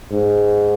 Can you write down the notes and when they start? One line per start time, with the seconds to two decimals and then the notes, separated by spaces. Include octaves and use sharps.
0.11 G#2